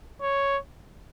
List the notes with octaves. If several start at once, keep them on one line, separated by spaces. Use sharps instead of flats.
C#5